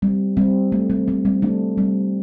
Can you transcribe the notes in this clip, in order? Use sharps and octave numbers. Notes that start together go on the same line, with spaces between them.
G3 C4
G3 C4
A3
G3 C4
G3 C4
G3 C4
A3 D4
G3 C4